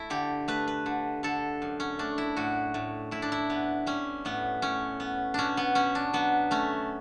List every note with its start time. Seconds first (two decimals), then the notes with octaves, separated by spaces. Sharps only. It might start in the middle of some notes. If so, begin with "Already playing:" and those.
Already playing: A3 E4 A4
0.10 D3 G4
0.48 A3 B4
0.68 B4
0.86 D3
1.23 D3 A4
1.62 F#2
1.80 C#4
1.99 A3 D4
2.18 E4
2.36 A2 F#4
2.74 A2
3.11 A2 E4
3.22 D4
3.32 E4
3.50 B3
3.86 G3 C#4
4.25 A2 B3
4.62 A2 C#4
5.00 B3
5.34 B2 C#4 D4
5.57 B3
5.75 B2 C#4
5.95 D4
6.13 F#3 B3
6.51 A3 C#4